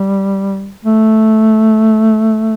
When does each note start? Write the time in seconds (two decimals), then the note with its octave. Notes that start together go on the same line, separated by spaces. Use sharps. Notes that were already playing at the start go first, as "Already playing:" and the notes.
Already playing: G3
0.85 A3